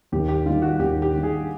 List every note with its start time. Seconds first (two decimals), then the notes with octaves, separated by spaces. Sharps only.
0.12 D#2 G4
0.28 G4
0.46 D#3 G3 F4
0.62 F#4
0.79 D#2 G4
1.02 G4
1.13 D#3 G3
1.23 G#4